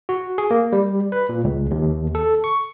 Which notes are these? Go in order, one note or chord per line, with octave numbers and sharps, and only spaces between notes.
F#4
G#4
A#3
G3
B4
A#2
C#2
D#2
A4
C#6